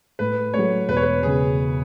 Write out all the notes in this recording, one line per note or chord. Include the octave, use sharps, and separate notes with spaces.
A2 B4
F#3 A3 C#5
E1 B4
C#5
B4
C#3 G#4